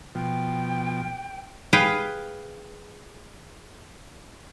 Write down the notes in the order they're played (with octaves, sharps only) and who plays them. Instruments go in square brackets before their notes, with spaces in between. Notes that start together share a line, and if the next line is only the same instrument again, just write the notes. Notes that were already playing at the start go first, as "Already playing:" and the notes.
[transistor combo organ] B2 F3 [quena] G5
[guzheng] G#4 B4 F5 G5